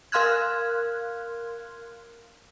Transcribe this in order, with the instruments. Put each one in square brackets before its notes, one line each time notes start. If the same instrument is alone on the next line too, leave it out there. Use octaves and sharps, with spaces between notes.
[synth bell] A#4 F5 C6 F6 F#6 G#6